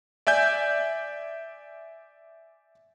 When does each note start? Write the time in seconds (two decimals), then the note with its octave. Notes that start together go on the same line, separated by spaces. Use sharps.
0.27 D5 E5 G#5 G6